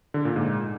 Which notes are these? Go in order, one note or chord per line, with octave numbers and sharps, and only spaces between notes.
D3
A#2
G#2